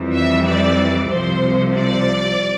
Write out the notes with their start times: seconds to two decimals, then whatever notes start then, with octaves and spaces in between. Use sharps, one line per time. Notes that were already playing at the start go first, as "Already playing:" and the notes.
Already playing: F2 E3 G3
0.14 E5
0.46 D5
1.11 C2 C3 F3 C5
1.75 D5